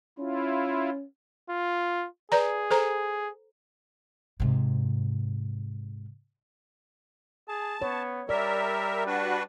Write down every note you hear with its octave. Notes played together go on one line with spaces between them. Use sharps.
C#4 E4 F4
F4
G#4 B4 D5 A#5
A4 C5 A#5
G#2 C3
G#4 A5
B3 C#5
G3 A#4 D5 E5
D4 F#4 B4